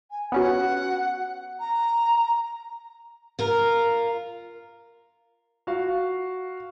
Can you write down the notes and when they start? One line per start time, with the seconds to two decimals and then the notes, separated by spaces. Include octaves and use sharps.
0.11 G#5
0.32 B3 C#4 F#4 F#5
1.60 A#5
3.39 F4 A#4
5.67 F#4 F5